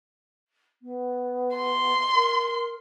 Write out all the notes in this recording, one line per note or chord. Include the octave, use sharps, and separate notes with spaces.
B3
C6
A#4